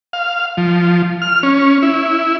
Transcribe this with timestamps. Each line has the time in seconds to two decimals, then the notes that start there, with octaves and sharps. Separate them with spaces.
0.13 F5
0.57 F3
1.22 F6
1.43 C#4
1.83 E4